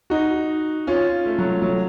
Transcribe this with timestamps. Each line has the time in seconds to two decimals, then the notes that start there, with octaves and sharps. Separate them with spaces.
0.10 D#4 F#4
0.87 C#4 F4
1.26 A3
1.39 F#3
1.62 F#3